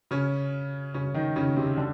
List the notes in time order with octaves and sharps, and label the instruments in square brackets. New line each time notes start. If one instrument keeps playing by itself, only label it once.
[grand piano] C#3 C#4
C#3 C#4
D#3 D#4
C#3 C#4
C3 C4
D3 D4